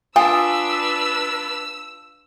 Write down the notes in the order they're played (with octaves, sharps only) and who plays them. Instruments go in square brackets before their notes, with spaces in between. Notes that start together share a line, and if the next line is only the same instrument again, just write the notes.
[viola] D4 B4 [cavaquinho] F4 D#6 [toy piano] G#5 [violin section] E6